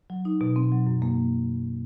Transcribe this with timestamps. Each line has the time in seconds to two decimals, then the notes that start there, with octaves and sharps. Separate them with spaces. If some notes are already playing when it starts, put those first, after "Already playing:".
0.10 F#3
0.25 D#4
0.41 B2
0.56 C4
0.72 F#3
0.87 F#2
1.02 A#3